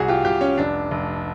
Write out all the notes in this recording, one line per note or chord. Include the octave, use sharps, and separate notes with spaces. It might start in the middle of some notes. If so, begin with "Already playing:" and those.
Already playing: C2 F#4 G#4
F4 G4
C2 F4 G4
C#4
F1 D4
F1